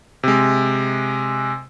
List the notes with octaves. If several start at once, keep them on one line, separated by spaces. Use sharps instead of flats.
C3 G#3